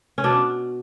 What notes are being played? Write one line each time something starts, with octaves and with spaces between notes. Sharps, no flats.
C#4
B2 D4